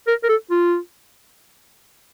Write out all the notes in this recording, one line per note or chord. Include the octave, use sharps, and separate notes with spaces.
A#4
A#4
A4
F4